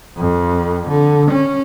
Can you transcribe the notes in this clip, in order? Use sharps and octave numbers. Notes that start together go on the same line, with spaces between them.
F2
D3
C#4